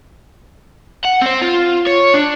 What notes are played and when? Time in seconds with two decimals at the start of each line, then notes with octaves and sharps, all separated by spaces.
1.05 F#5
1.21 C4 C5
1.41 F4
1.86 C#5
2.14 D4